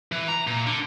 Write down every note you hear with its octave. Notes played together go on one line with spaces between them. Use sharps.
E3
A#5
A#2
D3